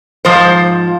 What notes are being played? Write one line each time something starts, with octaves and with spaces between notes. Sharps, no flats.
G#2 F3 C5